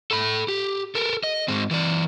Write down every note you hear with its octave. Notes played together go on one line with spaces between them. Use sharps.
A4 B5
G4
A4 A#4
D#5
G#2 C4
E3 D5